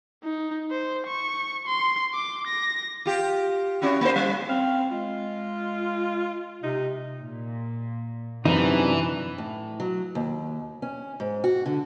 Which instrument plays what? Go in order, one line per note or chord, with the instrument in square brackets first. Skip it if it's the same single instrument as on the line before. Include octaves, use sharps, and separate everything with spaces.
[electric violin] D#4
C5
C#6
C6
D6
A#6
[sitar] F4 G4
C#4 E4 F#4
A#3 D#4 C5
G3
[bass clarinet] C4 [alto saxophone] F5
[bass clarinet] G#3 [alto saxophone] F4
[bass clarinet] C3 [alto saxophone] D#4
[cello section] A#2
[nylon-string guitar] F#2 C3 [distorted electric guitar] E3 [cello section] D4 F#4 [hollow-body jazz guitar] D#4
[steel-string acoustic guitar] A2
F#3
D#2
C#4
G#2
F#4
D3